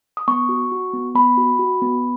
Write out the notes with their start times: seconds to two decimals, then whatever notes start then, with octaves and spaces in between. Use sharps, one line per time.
0.17 D#6
0.28 B3 C#6
0.49 F#4
0.72 F#4
0.93 B3
1.15 B3 B5
1.37 F#4
1.59 F#4
1.82 B3